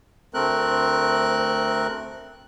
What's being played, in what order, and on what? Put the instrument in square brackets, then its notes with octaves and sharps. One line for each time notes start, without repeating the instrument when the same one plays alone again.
[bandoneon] D2 A3 C4 A#4 F#6